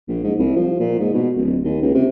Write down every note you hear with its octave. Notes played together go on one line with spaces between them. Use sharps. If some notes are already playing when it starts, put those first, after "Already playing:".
A#1
G#2
C2
F3
A#2
G#2
B2
D1
D#2
C#2
C3